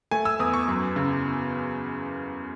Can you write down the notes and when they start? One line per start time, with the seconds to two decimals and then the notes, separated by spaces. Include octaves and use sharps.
0.11 A3 G#5
0.25 E6
0.39 E2 D#6
0.54 C#6
0.68 F#2
0.96 C#3